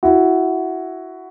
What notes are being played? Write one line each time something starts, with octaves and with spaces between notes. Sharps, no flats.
E4 F#4